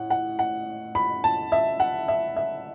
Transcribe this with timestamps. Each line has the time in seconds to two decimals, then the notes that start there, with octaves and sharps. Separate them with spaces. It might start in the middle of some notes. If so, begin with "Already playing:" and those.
Already playing: A2 F#5
0.10 F#5
0.39 F#5
0.95 B5
1.24 A5
1.52 E5
1.80 F#5
2.08 E5
2.36 E5